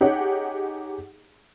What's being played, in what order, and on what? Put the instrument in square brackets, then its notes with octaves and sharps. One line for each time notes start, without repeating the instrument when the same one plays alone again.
[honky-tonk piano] D#4 G4 G#4 C#5 F#5